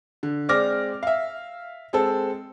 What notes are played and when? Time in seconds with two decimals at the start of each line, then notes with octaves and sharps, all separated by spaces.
0.23 D3
0.49 G#3 C4 D5 D6 F6 A#6
1.03 E5 F5
1.93 G#3 C4 A4